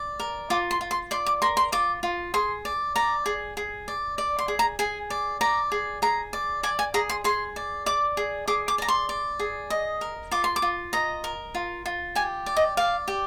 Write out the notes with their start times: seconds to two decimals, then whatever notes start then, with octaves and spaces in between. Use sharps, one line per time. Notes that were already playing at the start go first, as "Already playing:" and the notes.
Already playing: D5
0.20 A#4
0.50 F4 D6
0.71 C6
0.81 F4
0.91 C6
1.11 D5 C6
1.26 D6
1.42 A#4 C6
1.57 C6
1.72 F4 D6
2.03 F4
2.34 G#4 C6
2.65 D5
2.96 D5 A#5
3.26 G#4
3.57 G#4
3.88 D5
4.18 D5
4.39 C6
4.48 G#4
4.59 A#5
4.79 G#4 G#5
5.10 D5
5.41 D5 A#5
5.72 G#4
6.02 G#4 A#5
6.33 D5
6.63 D5 G#5
6.79 G#5
6.94 G#4 A#5
7.09 C6
7.24 G#4 C6
7.56 D5
7.86 D5 D6
8.17 G#4
8.48 G#4 D6
8.68 D6
8.78 D5 A#5
8.88 C6
9.09 D5
9.39 G#4
9.70 D#5
10.01 A#4
10.31 F4 D6
10.44 C6
10.56 D6
10.62 F4
10.93 D#5 A#5
11.24 A#4
11.55 F4
11.86 F4
12.15 G4 G#5
12.46 D5
12.57 D#5
12.77 D5 F5
13.08 G4